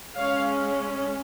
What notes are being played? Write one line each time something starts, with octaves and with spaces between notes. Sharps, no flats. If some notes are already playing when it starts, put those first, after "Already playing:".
G#3 C#4 C#5 F5